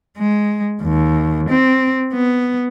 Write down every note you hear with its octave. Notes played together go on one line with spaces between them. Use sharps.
G#3
D#2
C4
B3